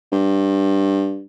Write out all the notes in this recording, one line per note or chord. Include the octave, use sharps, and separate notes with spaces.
G2